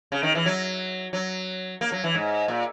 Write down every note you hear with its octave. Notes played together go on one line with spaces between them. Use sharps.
C#3
D#3
E3
F#3
F#3
A#3
F#3
E3
G#2
A#2